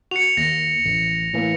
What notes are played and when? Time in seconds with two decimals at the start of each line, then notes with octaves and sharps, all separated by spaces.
0.11 F#4 C#7 F7
0.37 D#2 A#6
0.85 A1
1.33 A2 E3 A#3